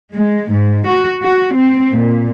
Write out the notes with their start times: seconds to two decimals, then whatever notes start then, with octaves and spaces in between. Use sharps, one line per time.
0.14 G#3
0.52 G#2
0.88 F#4
1.21 F#4
1.54 C4
1.92 A#2